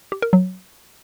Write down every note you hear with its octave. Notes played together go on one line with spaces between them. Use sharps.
G4
A#4
F#3